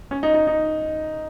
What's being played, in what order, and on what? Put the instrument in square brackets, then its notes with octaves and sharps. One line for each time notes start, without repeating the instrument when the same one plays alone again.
[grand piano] C#4
D#4
D#4
D#4